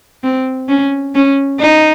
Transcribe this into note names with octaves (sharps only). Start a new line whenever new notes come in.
C4
C#4
C#4
D#4